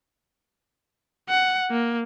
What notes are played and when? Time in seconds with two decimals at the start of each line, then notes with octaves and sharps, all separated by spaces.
1.29 F#5
1.71 A#3